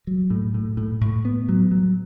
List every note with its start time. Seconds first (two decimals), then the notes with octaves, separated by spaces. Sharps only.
0.07 F#3
0.30 A2
0.54 A2
0.77 A2
1.01 A2
1.25 B3
1.49 F#3
1.71 F#3